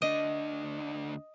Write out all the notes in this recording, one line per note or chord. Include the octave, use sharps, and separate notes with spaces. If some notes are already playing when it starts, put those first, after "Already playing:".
D2 D4 D#5